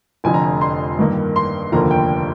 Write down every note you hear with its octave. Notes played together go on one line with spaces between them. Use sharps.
F1 F2 D3 G#5
A#5
G#5
C6
G2 D#3 A#3
C6
F1 D#2 D3 F3 A#3 A#5
G5